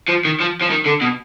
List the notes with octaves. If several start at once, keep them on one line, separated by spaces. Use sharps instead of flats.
F3
D#3
F3
F3
D#3
D3
B2